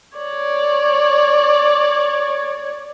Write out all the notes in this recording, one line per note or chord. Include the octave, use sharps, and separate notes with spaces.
C#5 D5